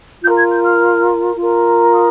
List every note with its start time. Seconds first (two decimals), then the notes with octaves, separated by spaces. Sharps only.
0.22 F4 A#4 G6
0.37 G#6
0.51 G6
0.65 F6
1.36 F4 A#4
1.93 D#6